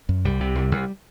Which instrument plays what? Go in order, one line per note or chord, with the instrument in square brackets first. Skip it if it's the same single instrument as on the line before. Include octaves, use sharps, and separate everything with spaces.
[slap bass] F#2
C2 G3
C3
C2
C2